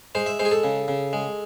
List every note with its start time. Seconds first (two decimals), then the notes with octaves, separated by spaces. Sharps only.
0.15 G#3 C5
0.26 E5
0.39 G#3 C5
0.45 G#4
0.52 A4
0.64 C#3
0.88 C#3
1.13 G#3